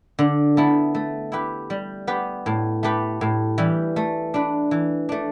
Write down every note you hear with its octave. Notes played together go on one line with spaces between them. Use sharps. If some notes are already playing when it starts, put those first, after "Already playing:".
D3
B3 E4 A4
A3
E4 G4 B4
G3
B3 G4 B4
A2
A3 G4 B4
A2
E3 G3
A3
D4 B4
E3
A3 D4